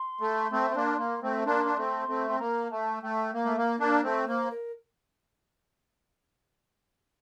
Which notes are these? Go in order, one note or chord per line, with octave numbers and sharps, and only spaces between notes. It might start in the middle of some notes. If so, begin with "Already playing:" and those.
Already playing: C6
A3
A3 C4
C4
A#3 D4
A#3
A3 C4
A#3 D4 C6
D4
A3 C4
A3 C4
C4 C6
A#3 A#5
A3 A5
A3 G5
A#3
A3
A#3
A#3 D4
A3 C4
A#3 C5
A#4